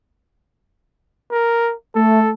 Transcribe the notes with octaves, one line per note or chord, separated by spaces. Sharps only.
A#4
A3 A4